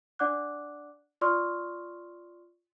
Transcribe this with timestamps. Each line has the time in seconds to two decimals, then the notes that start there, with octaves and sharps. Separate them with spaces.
0.19 D4 D5 F#5 D6 F#6
1.21 F4 D5 C6 C#6 D#6 F6